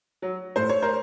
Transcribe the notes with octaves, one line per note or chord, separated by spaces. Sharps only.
F#3
A2 C5
C#5
A#4 C5